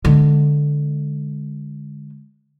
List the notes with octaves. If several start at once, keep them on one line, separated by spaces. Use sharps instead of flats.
D3 G#3